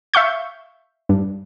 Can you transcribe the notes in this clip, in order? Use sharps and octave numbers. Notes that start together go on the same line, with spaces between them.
E5 F5 C#6 G6
G2